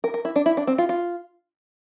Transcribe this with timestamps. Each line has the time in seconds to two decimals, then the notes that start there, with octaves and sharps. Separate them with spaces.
0.04 A#4
0.14 A#4
0.25 E4
0.36 D4
0.46 E4
0.57 D4
0.67 C4
0.78 F4
0.89 F4